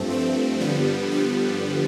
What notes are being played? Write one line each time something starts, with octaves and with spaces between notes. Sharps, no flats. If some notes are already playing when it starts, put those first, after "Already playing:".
Already playing: G2 F3 A3 C4
A3 C4
G2 D3 F3 G3 B3
G3 B3